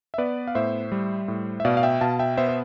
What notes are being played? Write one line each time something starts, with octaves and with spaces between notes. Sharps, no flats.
E5
B3 B4 D5
F5
A2 C5 E5
G3
A2
E5
B2 D5 F5
F5
E5 G5
B2 F5 A5
E5 G5
B3 C5 E5
C5